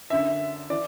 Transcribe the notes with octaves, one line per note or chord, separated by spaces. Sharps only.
F#2 D3 E5
E3 D5